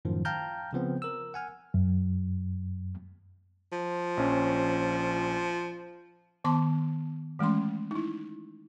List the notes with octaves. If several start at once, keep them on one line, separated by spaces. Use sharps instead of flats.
F#2 A2 D#3 F3
F5 G5 A5 A#5 F6 G6
C#3 F3 B3 C4
A#4 E6
F#5 G#5 F6
F#2
F3
A#1 C#4
D#3 B3 A5 C6 D6
E3 G#3 A3 C#4 C6
D#4 E4